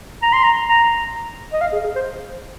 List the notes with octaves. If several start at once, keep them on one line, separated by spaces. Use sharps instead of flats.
A#5
C6
A#5
A#5
D#5
F5
G#4
G#4
C5